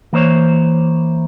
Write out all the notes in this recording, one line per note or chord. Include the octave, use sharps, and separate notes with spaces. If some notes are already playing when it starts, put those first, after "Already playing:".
E3 A#3 C5 C#5